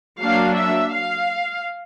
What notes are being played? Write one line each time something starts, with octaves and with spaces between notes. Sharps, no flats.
F#3 A#3 D4 F5
E5
F5